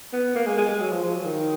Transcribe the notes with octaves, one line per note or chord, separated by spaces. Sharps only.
B3
A#3
G#3
G#3
G#3
F#3
F3
F3
F#3
D#3